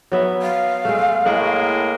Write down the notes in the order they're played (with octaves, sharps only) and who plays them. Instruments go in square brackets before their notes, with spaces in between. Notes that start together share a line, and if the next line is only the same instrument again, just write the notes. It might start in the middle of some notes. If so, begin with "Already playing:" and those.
[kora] F#3 B3 E5
[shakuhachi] F5
[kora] G#3 A3
[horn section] A2 G#3 A#3 [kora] A#4 F#5